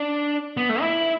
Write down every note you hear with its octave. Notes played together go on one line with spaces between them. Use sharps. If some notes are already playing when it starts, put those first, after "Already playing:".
Already playing: D4
B3
A3
E4